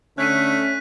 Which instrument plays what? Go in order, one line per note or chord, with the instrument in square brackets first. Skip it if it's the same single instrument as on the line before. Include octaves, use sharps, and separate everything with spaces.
[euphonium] D3 [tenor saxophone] A3 [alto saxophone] C#4 [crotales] F#6 B6 D#7